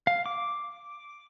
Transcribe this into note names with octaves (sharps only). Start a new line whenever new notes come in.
F5
D6